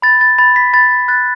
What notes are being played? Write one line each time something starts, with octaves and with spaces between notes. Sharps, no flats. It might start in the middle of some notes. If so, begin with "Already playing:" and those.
B5 A6
A6
B5 A6
B6
B5 A6
F#6 A6